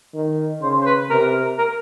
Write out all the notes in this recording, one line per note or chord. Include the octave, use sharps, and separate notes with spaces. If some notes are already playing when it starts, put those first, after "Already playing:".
D#3
C#3 C5
C5
B4
C3 A#4
A#4